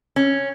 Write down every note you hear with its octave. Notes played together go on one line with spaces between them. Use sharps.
C#4